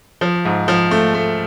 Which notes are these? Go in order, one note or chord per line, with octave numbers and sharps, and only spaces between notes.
F3
G#2
F3
A3
A3